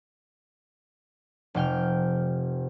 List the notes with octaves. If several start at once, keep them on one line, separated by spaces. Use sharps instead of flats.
F1 C3 G5 F6